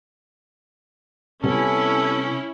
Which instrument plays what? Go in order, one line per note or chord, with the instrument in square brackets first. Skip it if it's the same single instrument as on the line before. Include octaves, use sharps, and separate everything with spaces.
[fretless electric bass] C3 G3 B3 [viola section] C#4 E4 [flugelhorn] A4